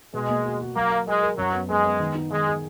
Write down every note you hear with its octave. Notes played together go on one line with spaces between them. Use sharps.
B2 G#3
A#3
F#4
F#4
F#3 A#3
A#4
G#3 A#4
A#4
F#2 F#3
B3
G#3 B3
B3
D#3
D#4
D#3 G#3
G#4